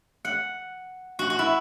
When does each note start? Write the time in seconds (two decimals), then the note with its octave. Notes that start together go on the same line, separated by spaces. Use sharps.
0.25 F#5
1.19 F#4
1.30 F#4
1.39 E4